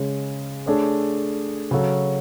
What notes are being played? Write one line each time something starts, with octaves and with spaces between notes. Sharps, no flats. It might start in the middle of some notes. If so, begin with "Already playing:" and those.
Already playing: C#3 G#3 C#4
A3 D4 G#4 C#5
C#3 F#3 C#4 F#4 A4